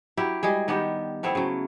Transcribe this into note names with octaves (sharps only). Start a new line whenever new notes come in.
F#3 E4 G4
G3 G#3 G#4
D#3 B3 D4 G4
A3 B3 C4 E4
C#3 F#3